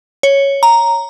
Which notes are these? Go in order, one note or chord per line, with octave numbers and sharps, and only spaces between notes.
C#5
A#5